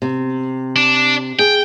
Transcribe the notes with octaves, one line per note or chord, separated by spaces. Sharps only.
C3
D4
G#4 G5